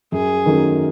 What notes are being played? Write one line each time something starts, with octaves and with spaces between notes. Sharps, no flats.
F#2 G#4
D#3 F#3 A3 C#4